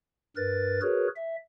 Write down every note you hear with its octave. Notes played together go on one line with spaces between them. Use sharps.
G2 A#4 B4 A6
F#4 G#4 A#4 B4 C#5
E5